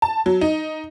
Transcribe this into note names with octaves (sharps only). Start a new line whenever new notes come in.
A5
F#3
D#4